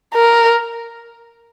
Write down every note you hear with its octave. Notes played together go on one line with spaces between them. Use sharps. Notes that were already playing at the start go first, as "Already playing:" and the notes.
A#4